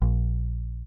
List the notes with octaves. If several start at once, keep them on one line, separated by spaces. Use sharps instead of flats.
A#1